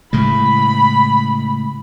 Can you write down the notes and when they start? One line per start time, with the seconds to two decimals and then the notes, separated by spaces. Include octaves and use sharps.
0.13 A2 C#3 G#3 B5